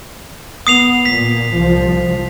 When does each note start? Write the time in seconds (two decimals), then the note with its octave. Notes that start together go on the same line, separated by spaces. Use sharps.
0.67 B3 D#6 C7 F7
1.05 A#2 B6
1.51 C2 F3